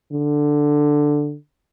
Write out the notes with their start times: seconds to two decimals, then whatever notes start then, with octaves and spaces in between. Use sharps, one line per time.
0.12 D3